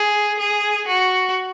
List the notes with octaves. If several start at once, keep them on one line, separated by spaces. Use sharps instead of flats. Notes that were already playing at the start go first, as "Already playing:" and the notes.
Already playing: G#4
G#4
F#4